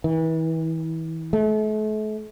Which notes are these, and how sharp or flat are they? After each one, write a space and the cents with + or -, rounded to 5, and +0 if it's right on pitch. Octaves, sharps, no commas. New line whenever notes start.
E3 -35
A3 -40